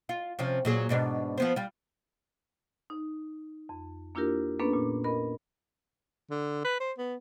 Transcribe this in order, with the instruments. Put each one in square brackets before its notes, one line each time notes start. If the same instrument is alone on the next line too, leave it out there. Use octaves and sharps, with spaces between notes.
[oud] F4
C3 F3 C#4
A#2 F#3 G#4
G#2 B2 D4
F3 B3 C5
G3 F4
[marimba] D#4
F2
A#3 D4 E4 F4 G4 A#4
A#3 B3 C#4 D4 A4 B4
A#2
A#4 D#5 B5
[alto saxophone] D3
B4
C5
B3